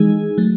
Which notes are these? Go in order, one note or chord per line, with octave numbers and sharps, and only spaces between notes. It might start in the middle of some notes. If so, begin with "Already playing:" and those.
Already playing: E3 G#3 D#4 G#4
F#3 A3